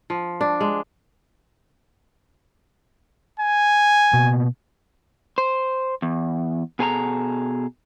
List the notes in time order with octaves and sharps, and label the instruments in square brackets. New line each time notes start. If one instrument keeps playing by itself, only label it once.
[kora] F3
D4
G#3
[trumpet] G#5
[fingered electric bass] B2 A#3 B3
[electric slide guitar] C5
E2
B2 G#4 A4 G#5 A#5